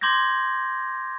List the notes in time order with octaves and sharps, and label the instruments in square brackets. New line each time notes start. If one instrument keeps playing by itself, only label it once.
[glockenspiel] C6 D6 G6 G#6 A#6